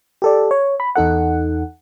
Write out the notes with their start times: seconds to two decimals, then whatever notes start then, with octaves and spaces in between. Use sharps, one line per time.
0.22 G4 A4 D5
0.51 C#5
0.80 B5
0.96 E2 D#4 A4 F#5